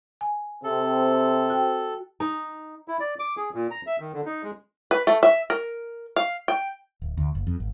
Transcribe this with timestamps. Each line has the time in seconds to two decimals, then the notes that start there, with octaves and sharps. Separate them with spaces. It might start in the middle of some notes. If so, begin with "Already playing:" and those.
0.21 G#5
0.64 C3 C4 A4
1.50 F#4 G5
2.20 D#4
2.88 E4
3.00 D5
3.19 D6
3.37 G#4
3.54 A#2
3.71 A#5
3.87 E5
3.99 D#3
4.14 D3
4.26 D#4
4.43 G#3
4.91 B4
5.07 A3
5.23 E5
5.50 A#4
6.16 F5
6.48 G5
7.02 D1
7.17 D2
7.35 F#1
7.47 F2
7.60 G#1